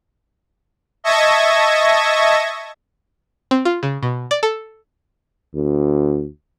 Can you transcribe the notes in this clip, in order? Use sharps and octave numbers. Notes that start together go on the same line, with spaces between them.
D#5 E5 A5 C#6 G#6 A#6
C4
F4
C#3
B2
D5
A4
D2